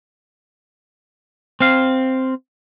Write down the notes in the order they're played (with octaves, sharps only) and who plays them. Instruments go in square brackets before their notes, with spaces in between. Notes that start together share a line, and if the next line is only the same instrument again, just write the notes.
[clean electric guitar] C4 F5